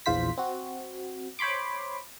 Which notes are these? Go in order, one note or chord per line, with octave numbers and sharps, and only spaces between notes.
A#1 E2 F4 C5 B6
C4 F#4
C5 C#5 B5 C6 D6